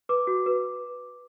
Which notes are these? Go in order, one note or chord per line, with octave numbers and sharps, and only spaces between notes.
B4 D6
F#4
B4